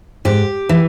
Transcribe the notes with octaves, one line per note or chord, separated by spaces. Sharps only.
G#2 G4
E3